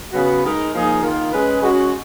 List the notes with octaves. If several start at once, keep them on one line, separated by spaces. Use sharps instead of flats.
C#3 F#3 B3 F#4 B4
G#3 D#4 A#4
F3 A#3 D#4 G#4
D#3 A#3 F4
G#3 C#4 G#4 B4
G#3 C#4 F#4